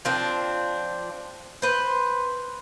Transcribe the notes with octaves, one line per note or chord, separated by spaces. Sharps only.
F3 C4 D4
B4 C5